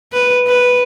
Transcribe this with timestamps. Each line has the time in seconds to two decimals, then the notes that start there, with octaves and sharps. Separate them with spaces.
0.12 B4
0.47 B4